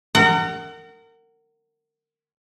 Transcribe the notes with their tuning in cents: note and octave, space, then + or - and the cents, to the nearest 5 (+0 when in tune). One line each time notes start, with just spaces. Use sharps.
A#4 -30 F#5 +25